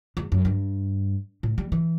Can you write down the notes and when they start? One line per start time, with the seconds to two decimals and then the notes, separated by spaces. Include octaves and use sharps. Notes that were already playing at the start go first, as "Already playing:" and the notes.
0.17 E2
0.32 F#2
0.45 G2
1.43 A2
1.58 G3
1.72 E3